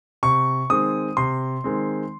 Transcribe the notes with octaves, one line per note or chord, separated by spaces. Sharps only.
C3 C#6
D#3 G#3 C4 D#6
C3 C6
D#3 G#3 C4